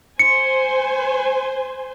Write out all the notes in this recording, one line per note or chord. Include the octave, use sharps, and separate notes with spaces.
C5 G#5 C#7